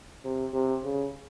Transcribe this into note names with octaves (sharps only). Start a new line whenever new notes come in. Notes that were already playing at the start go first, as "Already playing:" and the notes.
C3
C3
C#3